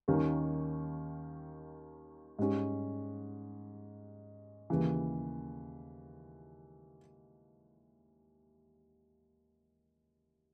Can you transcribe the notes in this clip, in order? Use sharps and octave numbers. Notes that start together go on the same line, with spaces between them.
D#2 D#3 A#3 C#4
G#2 G3 C#4
D#2 C#3 E3